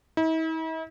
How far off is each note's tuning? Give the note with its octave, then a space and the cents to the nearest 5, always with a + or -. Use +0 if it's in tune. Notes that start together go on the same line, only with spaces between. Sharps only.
E4 -45